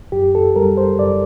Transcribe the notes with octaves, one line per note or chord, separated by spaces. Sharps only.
F#2 G4
A4
G3 A#4
C5
F#2 D5